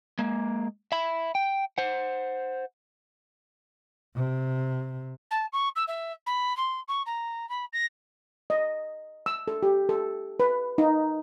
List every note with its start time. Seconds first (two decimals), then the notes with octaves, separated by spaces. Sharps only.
0.19 G#3 A#3
0.92 E5 B5
1.35 G5
1.78 C5 F#5
4.16 C3
5.30 A5
5.52 C#6
5.76 E6
5.87 E5
6.26 B5
6.56 C6
6.88 C#6
7.06 A#5
7.49 B5
7.73 A#6
8.50 D#5
9.26 E6
9.48 A4
9.63 G4
9.89 A4
10.40 B4
10.78 D#4